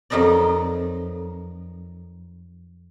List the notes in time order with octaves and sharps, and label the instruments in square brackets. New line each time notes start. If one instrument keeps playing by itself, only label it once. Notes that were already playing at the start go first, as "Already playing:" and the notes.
[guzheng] F2 F#3 D#4 A#4 D5